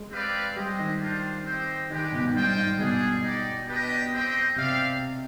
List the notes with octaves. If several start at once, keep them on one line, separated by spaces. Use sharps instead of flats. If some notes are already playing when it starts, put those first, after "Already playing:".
Already playing: G#3
C4 G4 B4 D5 F5
G3 G#3 C4 G4 C5 D#5
D#3
D4 F4 C5
C4 G4 C5 D#5 G5
D#3 G#3 D4 G4 B4
B2
G#2
G2 F4 C5 D#5 G5
G#2
B2 G3 D4 G#4
D#4 G4 D5
D4 G4 B4 D#5 G5
C4 G4 C5 D#5 G5
C3 C4 G4 D5 F5